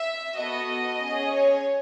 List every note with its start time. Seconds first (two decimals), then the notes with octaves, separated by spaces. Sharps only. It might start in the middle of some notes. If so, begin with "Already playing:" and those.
Already playing: E5
0.36 B3 F#4 A4 D#5
1.00 C#4 G#4
1.31 C#5